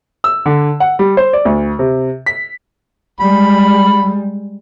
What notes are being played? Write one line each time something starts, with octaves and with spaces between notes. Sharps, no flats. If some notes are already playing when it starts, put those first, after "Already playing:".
E6
D3
F#5
G3
C5
D5
D2
C3
B6
G3 G#3 B5